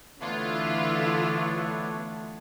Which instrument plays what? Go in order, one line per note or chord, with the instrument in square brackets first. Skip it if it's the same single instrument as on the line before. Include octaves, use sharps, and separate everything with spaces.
[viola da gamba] D3 E3 E4 [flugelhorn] A3 [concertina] B3 D4 C#5 [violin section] F4